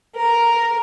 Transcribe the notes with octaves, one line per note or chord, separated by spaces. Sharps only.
A#4